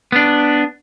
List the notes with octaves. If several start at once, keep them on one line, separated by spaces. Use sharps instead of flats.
B3 D4